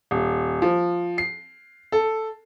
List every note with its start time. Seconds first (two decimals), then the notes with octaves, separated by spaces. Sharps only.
0.11 D#1
0.62 F3
1.18 C7
1.92 A4